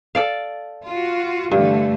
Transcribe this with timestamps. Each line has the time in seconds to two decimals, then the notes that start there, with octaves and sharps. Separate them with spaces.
0.15 A4 D5 F5
0.87 F4 F#4
1.51 G2 D3 E3 A3